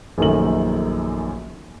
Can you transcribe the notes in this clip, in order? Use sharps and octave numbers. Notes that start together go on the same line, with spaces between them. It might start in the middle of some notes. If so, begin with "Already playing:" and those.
A#1 F#2 D#3 A3 F#7